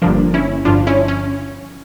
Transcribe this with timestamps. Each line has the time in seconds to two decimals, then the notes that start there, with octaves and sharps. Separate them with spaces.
0.02 G1 G2 D3 F3 A#3 D4
0.34 C#4 E4
0.65 G1 G2 D3 F3 D4 F4
0.87 C#4 E4
1.08 C#4